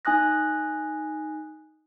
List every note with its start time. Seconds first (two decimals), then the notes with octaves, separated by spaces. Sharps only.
0.05 D#4 G#5 D#6 F#6 A#6